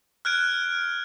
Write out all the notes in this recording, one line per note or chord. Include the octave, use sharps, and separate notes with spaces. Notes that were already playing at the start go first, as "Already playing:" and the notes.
F6 F#6 G#6 D7